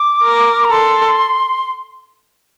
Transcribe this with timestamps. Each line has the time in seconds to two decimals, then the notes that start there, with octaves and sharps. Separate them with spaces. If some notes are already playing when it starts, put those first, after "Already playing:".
Already playing: D6
0.23 A#4
0.65 A#5
0.71 A4 C6